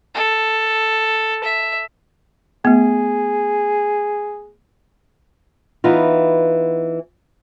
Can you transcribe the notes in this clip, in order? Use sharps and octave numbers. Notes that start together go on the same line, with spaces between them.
A4
E5
A3 B3 G#4
E3 B3 D#4 F4